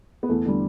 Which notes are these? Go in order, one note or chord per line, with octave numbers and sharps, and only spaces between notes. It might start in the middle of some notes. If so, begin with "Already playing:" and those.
B3
E2 A3
D3 G3